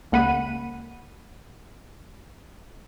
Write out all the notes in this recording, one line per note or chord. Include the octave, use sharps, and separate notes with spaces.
C#2 A#3 F#5 B5 D#7